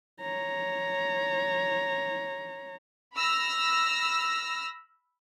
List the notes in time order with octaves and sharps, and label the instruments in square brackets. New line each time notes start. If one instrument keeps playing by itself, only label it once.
[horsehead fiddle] C#5 A#5
[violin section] B5 E6 F6 A#6